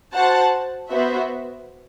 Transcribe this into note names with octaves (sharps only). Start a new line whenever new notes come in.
F#4 C5 F#5 A5
B3 F#4 C5 E5